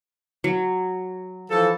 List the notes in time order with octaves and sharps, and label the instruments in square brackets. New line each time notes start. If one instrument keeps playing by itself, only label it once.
[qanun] F#3
[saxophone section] E3 F3 A4